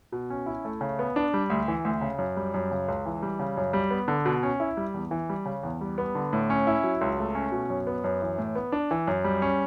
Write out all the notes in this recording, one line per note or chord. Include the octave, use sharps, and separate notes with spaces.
B2
C#4
E4
A3
C#3
B3
D4
G3
D2
E3
D2
C#3
F#2
G3
F#2
C#3
C#2
E3
G3
C#3
F#2
G3
B3
D3
B2
C#4
E4
G3
E2
E3
G3
C#3
E2
G3
B3
D3
A2
C#4
E4
F#3
C#2
A3
C#4
B2
F#2
B3
F#2
E3
A2
B3
D4
E3
F#2
G3
C#4